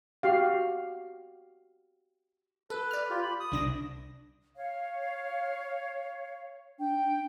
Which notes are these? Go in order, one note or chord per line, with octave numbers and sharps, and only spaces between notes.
F#4 G4 F5
A4 B4
D5 F6
F4 G4
B5
D#6
C2 D4 A#6
C#5 F5
D4 G5